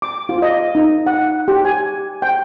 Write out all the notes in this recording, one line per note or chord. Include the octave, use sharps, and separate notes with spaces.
D6
F4
D#5
D#4
F#5
G4
G#5
G5